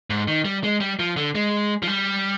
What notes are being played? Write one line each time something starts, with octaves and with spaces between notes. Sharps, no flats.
G#2
D#3
G3
G#3
G3
F3
D3
G#3
F3
G3